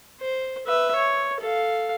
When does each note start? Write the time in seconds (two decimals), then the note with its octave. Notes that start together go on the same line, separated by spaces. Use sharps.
0.21 C5
0.66 B4 E5
0.96 C#5
1.41 A4 F5